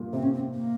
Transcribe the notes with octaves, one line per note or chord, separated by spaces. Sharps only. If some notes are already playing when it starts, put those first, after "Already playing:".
Already playing: G2 A#2
C3 C4
C#4
C4
A#3